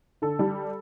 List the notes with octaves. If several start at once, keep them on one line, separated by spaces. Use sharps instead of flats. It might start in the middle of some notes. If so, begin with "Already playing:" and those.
D3 A4
G3